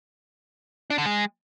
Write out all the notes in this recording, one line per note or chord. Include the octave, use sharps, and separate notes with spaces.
D4
D3
G#3